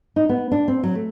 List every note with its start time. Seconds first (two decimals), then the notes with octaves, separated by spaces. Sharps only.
0.16 D#4
0.29 B3
0.52 D4
0.68 C4
0.83 F#3
0.95 A3